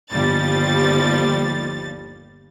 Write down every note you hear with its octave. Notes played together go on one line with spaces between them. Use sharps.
G1 D#2 F3 G3 A6